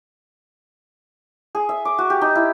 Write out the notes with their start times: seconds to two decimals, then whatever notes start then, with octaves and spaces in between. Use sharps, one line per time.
1.55 G#4
1.69 E5
1.85 D6
1.98 F#4
2.10 G4
2.21 D#4
2.35 E4